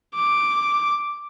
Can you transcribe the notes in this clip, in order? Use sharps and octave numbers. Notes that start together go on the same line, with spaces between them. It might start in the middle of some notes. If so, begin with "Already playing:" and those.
D6